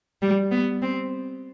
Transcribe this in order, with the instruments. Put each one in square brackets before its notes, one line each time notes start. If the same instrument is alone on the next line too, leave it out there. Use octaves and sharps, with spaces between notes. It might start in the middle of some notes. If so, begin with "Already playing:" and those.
[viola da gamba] G3
B3
C4